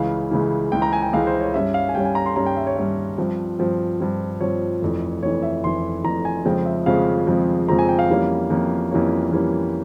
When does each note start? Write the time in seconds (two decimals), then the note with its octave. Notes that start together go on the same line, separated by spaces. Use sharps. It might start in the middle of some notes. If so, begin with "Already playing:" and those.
Already playing: C#2 C#3 E3 F5
0.31 C#2 C#3 E3
0.72 C#2 C#3 E3 G5
0.82 A#5
0.93 G#5
1.02 G5
1.13 C#2 C#3 E3 F5
1.27 C5
1.40 C#5
1.54 G2 G3 C#4 E5
1.74 F5
1.89 G#5
1.95 G2 G3 C#4 G5
2.05 G#5
2.15 A#5
2.26 C6
2.36 G2 G3 C#4 A#5
2.46 G5
2.57 E5
2.67 C#5
2.77 G2 G3 C#4 E5
3.18 G2 F3 C4
3.59 G2 F3 C4
4.00 G2 F3 C4
4.40 G2 F3 C4 C#5
4.82 F1 F2 E3
5.22 F1 F2 E3 C#5
5.43 E5
5.64 F1 F2 E3 C6
6.04 F1 F2 E3 A#5
6.25 G#5
6.45 F2 C#3 F3 G#3 C4 G5
6.66 E5
6.86 F2 C#3 F3 G#3 C4 F5
7.27 F2 C#3 F3 G#3 C4
7.68 F2 C#3 F3 G#3 C4 A#5
7.79 G#5
7.89 G5
7.99 F5
8.09 F2 E3 G3 A#3 C#4
8.50 F2 E3 G3 A#3 C#4
8.91 F2 E3 G3 A#3 C#4 C#5
9.32 F2 E3 G3 A#3 C#4